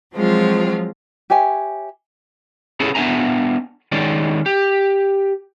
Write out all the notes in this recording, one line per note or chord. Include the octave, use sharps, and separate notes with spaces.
F3 F#3 G#3 C4 F4
G4 C#5 E5 G#5
B3 C#4 E4 G#4 A4
B3 D4 E5 G#5 A#5
D#3 G#3 C#4 D5
G4